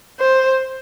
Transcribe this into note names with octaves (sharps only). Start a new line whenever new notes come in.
C5